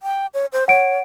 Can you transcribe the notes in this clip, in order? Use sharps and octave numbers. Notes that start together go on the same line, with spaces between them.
G5
C#5
C5
C#5 F#5 D7